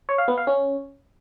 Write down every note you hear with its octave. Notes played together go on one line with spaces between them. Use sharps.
C#5
F5
B3
F5
C#4